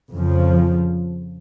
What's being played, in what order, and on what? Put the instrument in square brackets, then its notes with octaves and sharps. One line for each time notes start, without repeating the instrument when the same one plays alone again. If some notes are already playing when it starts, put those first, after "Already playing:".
[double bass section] F2 C#3 F3